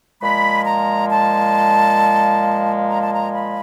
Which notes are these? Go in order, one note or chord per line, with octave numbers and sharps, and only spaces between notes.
A#2 F3 G#3 B5
A#5
A5
A#5
A5
A#5
B5